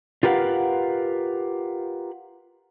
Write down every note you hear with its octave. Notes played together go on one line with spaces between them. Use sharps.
F4 G4 A#4 B4 F5 F#5